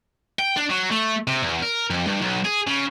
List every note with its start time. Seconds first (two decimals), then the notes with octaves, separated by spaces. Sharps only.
0.39 G5
0.57 D4
0.70 F#3
0.91 A3
1.27 C3
1.43 E2
1.62 A#4
1.90 F2
2.07 G2
2.21 B1
2.45 G#4
2.67 C#3